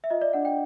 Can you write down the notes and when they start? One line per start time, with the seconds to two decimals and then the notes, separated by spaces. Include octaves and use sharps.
0.04 E5
0.10 F4 D#5
0.21 D5
0.33 D4 F#5
0.45 G5